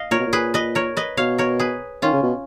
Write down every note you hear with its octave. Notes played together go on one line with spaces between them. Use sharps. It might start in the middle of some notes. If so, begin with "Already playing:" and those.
Already playing: D#5 F5
A#2 A#4 C#5
B2
A#2
G#4 B4
B4 D#5
A#4 C#5
B4 D#5
B2 C#5 F5
A#4 C#5
G#4 B4
D#3 C#4 F4
C#3
B2